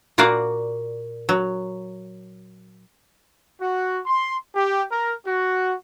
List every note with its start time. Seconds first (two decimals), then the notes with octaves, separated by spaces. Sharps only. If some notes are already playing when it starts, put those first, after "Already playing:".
0.18 A#2 A#3 F#4 D5 F5 A#5
1.29 F#3
3.60 F#4
4.06 C6
4.55 G4
4.92 A#4
5.26 F#4